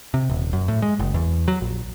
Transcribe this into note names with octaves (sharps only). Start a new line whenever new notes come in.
C3
D#1
F#2
A2
G#3
F#1
E2
F#3
A#1